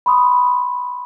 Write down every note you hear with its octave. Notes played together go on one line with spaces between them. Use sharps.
B5 C6 D#6